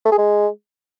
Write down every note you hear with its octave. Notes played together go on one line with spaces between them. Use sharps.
A3
G#4
G#3